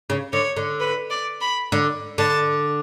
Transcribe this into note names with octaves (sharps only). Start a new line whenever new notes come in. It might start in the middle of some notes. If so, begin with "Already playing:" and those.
C#3
D3 C#5
D3
B4
D5
B5
D3
D3 A5